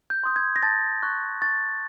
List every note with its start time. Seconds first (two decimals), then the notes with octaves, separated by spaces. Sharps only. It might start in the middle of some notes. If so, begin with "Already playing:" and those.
0.10 G6
0.24 C6 D#6 G6
0.36 G#6
0.56 A#6
0.63 A5 A6
1.03 C#6 F#6
1.42 C#6 A6